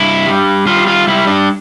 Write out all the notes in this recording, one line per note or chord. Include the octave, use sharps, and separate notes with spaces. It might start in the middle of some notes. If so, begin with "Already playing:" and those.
Already playing: G2 E4
G3
G3 F4
F4
G3 E4
D4